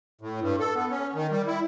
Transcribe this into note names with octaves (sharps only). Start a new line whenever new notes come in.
A2
G2
A4
B3
C#4
D#3
G3
E4